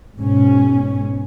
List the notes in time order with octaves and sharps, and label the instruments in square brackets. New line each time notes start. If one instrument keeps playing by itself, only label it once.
[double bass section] G#2 B2 C#4